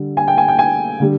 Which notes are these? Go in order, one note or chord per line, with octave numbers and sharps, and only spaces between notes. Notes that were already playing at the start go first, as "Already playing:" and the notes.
Already playing: D3 G3
G#5
G5
G#5
G5
G#5
D3 G3